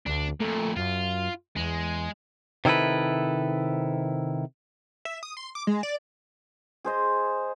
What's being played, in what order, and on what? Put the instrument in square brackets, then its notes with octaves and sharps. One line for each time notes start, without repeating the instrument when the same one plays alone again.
[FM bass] D2 [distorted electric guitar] D4
[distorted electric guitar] F2 A#2 [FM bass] A3
[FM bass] F#2 [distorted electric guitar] F4
[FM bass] E2 [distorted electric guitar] G#3
[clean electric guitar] C3 D#3 E4 A4 B4
[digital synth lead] E5
D#6
C6
D6
G#3
D5
[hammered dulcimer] G#4 C5 D#5